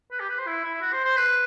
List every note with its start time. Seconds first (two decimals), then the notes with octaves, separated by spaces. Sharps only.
0.11 B4
0.20 G4
0.29 B4
0.38 C5
0.47 E4
0.64 E4
0.81 F#4
0.93 C5
1.04 C5
1.17 B4